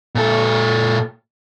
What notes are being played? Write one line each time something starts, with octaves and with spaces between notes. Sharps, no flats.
A#2 A4